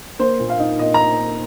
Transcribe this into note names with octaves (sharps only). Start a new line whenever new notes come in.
A#3 C5
A#2
F5
D#4
A#2 D#5
A#5